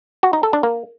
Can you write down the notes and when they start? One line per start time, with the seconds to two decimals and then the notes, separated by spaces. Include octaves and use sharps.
0.23 F#4
0.33 D#4
0.43 A4
0.53 D4
0.63 A#3